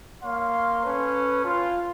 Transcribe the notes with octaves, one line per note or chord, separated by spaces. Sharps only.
A#3 C#5 F5 C6
C#4 A4 B4
F4